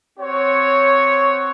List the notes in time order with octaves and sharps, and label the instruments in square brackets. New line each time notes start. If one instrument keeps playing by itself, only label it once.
[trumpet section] C4 F#4 C#5